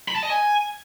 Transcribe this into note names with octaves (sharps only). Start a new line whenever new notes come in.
B5
A5
D#5
G#5